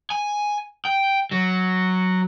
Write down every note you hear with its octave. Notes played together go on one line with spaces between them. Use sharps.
G#5
G5
F#3